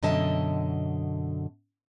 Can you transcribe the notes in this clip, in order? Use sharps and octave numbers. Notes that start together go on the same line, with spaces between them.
F#2 B2 D3 D#5 E5 A5